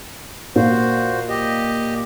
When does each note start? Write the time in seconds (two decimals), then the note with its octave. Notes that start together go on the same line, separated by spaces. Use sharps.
0.56 A#2 F#4 C5
1.29 G4 D#5